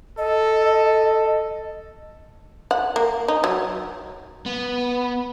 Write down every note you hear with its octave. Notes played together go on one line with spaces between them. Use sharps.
A4 D#5
F#5
A#3
D#4
F#3
B3